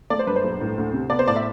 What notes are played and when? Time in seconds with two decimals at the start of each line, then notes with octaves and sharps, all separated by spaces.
0.10 A3 D5
0.19 C5
0.27 G2 B4
0.36 C5
0.44 B1
0.61 A2
0.78 D2
0.93 C3
1.10 B3 D5
1.19 C5
1.28 A2 D5
1.36 E5